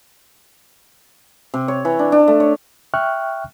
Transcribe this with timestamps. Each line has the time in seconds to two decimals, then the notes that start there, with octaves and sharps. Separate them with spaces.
1.54 C3
1.68 C#5
1.85 E3
1.99 D4
2.12 D4
2.28 A3
2.40 C#5
2.94 E5 G5 C#6 F6 F#6